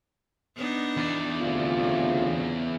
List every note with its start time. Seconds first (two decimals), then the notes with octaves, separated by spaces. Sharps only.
0.56 B3 D4 D#4
0.97 E2 D5
1.41 D2 C3 F4
1.80 C#3